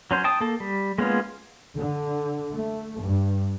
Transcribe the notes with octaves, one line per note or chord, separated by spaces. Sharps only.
F#3 C#4 C5
G5 A5 D#6
A#3 A4
G3
G#3 A#3 B3 C#4 F4
D3
A3
G2